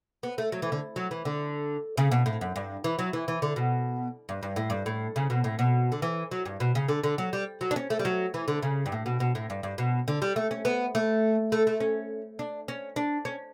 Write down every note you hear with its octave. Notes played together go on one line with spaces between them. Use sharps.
B3
A3
F#3
E3
D3
F#3
E3
D3
C#3
B2
A2
F#2
G2
E3
F#3
E3
E3
D3
B2
G2
G2
A2
G2
A2
C#3
B2
A2
B2
D3
E3
F#3
G2
B2
C#3
D3
D3
F#3
G3
F#3
D4
C#4
A3
G3
F#3
E3
D3
C#3
G2
A2
B2
B2
A2
G2
G2
B2
D3
G3
A3
C#4
B3
A3
A3
A3
C#4
D4
C#4
D4
C#4